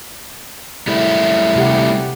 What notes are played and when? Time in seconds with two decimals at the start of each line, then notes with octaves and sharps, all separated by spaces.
0.87 G3 A3 E4
1.56 C3 G4 F#5